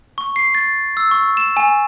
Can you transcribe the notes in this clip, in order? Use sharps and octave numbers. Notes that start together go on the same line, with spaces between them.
C#6
C7
A6
E6
C#6
E7
G#5